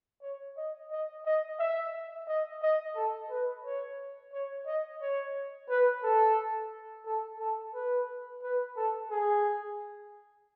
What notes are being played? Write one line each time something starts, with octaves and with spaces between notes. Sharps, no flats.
C#5
D#5
D#5
D#5
E5
D#5
D#5
A4
B4
C#5
C#5
D#5
C#5
B4
A4
A4
A4
B4
B4
A4
G#4